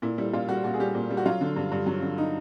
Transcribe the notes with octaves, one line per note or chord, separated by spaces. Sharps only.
A#2 E4
G3 E4
A#2 F4
G3 F#4
A#2 F#4
G#4
G3 G4
A#2
G3
F#4
F#3 F4
D3
G2
G2
F#3
D3
D#4